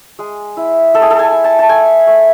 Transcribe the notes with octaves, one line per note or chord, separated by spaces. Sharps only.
G#3
E4
G#3 A4
G#4
A4
G#5
E4
A5
A5
A3 G#5
A3